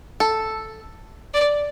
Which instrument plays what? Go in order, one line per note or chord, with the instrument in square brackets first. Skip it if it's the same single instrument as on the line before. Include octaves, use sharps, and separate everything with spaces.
[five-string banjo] A4
[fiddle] D5